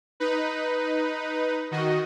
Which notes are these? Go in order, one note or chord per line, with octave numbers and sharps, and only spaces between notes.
D#4 B4
D#3 F#4 D#5